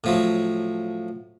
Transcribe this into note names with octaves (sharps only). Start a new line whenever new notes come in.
A2 F3 F#3